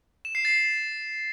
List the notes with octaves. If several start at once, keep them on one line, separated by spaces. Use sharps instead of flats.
E7
C7
A6